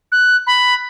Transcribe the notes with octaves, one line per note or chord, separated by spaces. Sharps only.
F#6
B5